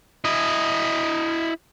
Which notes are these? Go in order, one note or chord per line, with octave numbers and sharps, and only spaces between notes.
E4 D#5